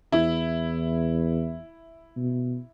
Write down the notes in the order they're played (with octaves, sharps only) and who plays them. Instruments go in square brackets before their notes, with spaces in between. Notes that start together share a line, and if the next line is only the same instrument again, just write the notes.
[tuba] E2 [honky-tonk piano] E4
[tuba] B2